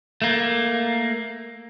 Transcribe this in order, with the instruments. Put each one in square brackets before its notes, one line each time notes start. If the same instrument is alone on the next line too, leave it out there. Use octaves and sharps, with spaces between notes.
[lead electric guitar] A3 A#3